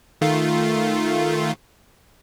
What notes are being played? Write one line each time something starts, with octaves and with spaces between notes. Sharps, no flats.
D#3 A3 F4